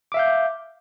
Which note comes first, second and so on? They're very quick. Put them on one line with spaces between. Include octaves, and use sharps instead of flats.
D6 E5 F5 G6